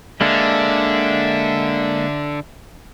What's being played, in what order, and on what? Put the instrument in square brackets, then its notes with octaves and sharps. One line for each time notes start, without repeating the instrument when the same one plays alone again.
[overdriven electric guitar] D3 [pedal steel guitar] G#3 A#3 D4 [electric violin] E5